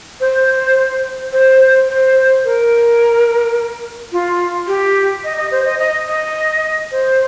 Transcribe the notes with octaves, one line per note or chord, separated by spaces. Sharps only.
C5
C5
C5
A#4
F4
G4
D#5
D#5
C5
D#5
D#5
D#5
C5